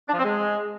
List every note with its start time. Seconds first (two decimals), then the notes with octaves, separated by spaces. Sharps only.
0.08 D4
0.13 F3
0.19 C4
0.24 G#3